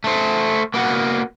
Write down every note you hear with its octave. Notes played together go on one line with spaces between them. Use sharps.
A3 C5
A#3 B3 F#4